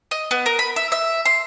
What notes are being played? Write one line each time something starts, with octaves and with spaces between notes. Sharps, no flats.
D#5
B3
A#4
B5
E5
E5
C6